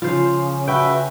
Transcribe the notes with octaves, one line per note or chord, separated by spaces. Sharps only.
C#3 F3 F4 C5
F#4 B4 E5 G5